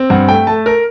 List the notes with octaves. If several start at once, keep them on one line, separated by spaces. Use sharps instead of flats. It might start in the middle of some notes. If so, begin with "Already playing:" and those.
Already playing: C4
G2 F#5
A3 G5
A3 A5
A#4